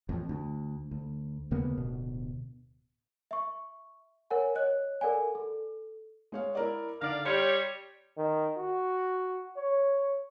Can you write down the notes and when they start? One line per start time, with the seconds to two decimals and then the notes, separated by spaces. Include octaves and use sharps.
0.09 A1 F2
0.29 D2
0.91 D2
1.51 D#2 C#3 A#3 B3
1.77 D1 B2
3.31 E5 C#6
4.30 A#4 C#5 F#5 G#5
4.55 C#5 D#5 F#6
5.01 A4 A#4 D5 F#5 G#5
5.35 A4
6.32 G#3 C#5 F5
6.55 E4 A#4 D5
7.01 D3 D#4 D5 F5 A#6
7.25 G3 C#5 C6
8.17 D#3
8.57 F#4
9.57 C#5